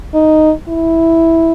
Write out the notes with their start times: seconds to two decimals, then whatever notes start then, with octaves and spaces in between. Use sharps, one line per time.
0.14 D#4
0.68 E4